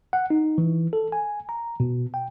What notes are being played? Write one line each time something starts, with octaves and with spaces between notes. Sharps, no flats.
F#5
D#4
E3
A4
G#5
A#5
B2
G5